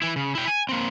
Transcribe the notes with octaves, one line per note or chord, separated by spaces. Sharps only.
E3 E4
C#3
E4 G5
G#5
A#3 C4